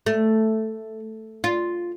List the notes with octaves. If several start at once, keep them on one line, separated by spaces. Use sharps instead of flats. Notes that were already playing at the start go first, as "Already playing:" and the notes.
A3
F4